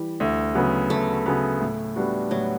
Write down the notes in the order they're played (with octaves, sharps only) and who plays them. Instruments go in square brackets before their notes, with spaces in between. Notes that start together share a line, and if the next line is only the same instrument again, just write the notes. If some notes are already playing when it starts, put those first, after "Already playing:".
Already playing: [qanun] E3 G3
[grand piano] D2
C#3 F#3 B3
[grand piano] D2 [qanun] A3
[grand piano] C#3 F#3 B3
A2
G3 B3 D4 F#4
[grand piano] A2 [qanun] F#3